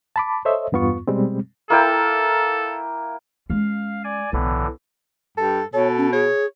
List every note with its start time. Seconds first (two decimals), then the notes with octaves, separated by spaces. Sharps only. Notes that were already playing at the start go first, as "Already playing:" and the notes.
0.16 A5 B5 D6
0.45 A4 C5 C#5 D#5 E5
0.72 E2 G2 B3 F4 C#6
1.07 B2 G3 G#3 C4
1.70 A#3 E4 A4 G5
3.50 G#3 C#4 F5
4.04 D5 G#5
4.33 B1 A2 D3 E3
5.37 G2 A4
5.74 B2 A4 C#5
5.97 C#4
6.13 G#4 C#5